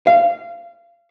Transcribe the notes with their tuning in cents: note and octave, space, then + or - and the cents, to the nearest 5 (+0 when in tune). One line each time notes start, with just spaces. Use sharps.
F5 -25